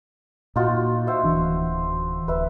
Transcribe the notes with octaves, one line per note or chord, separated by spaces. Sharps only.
A#2 D#4 F4 F#4
C5 E5 F#5
D1 E3 D4
D1 B4 E5